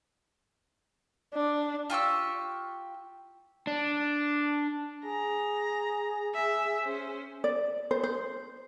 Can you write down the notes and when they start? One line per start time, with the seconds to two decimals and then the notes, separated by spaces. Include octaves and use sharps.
1.34 D4
1.90 F4 G4 C#6 E6
3.67 D4
5.05 G#4 A#5
6.34 E5
6.84 C#4 C5
7.44 D5
7.91 C5
8.04 C5